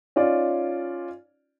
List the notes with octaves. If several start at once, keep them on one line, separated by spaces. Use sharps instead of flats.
C#4 D#4 F4 D5